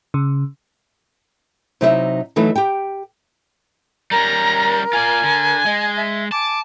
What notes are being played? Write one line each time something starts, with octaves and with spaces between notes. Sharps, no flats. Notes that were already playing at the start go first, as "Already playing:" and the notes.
C#3
C3 F#3 D#4 E4 C#5 E5
E3 F#3 A3 D#4
G4 G5
G3 C#4 A#4 A#5
F4 D5 G#5
D3
G#3 D#5
E5
G#5 A5 D6